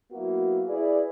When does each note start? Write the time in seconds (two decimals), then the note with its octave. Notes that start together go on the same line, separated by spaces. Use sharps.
0.12 F#3 A#3 B3 E4 F#4
0.69 E4 G#4 B4 D5